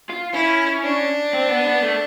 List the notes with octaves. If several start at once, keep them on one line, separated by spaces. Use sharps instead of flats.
F4
C#4 E4
D4
C4
B3
B3
A3